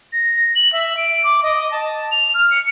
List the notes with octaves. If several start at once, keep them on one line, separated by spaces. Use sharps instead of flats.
A#6
F#7
E5
D7
D6
D#5
A5
F7
F6
C#7